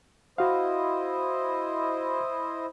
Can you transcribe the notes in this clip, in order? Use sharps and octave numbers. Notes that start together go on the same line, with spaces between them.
E4 F#4 C5 D#5 F5